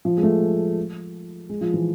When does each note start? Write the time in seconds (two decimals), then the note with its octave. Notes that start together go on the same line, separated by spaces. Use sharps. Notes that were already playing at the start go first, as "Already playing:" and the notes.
0.05 F3
0.18 G#3
0.23 A3
1.49 G#3
1.61 F3
1.74 E3